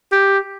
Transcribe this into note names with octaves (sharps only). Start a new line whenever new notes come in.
G4